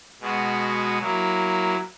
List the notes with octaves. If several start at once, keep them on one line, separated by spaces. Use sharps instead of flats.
B2 G#3 B3 F#4
F#3 A#3 E4